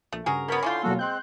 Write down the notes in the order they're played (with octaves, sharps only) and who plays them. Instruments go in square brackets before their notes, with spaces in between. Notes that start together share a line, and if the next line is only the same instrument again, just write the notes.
[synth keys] A#1 [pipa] A3
[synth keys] G2 C#3 [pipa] F#4 G#4 A#4
[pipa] B2 B3 [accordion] A#4 C#5 B5
[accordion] D3 C6 [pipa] C#4 E4 F4 [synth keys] D6 G6
[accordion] E2 F#4 A4 [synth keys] B2 F#3 A#3
[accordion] G#3 C4 [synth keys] C6 F#6 G6